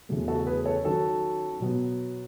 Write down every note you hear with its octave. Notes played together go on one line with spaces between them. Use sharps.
E2 C#3 F#3 A3
F#4 A4
G#4 B4
A4 C#5
D#3 F#3 C#4 F#4 A4
B2 F#3 B3